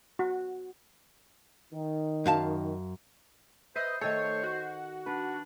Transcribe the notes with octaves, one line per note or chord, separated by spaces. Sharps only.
F#4
D#3
F#2 F5 A5
B4 C5 D#5 E5
D#3 A3 A4 C5 C#5
F#4
D4 B4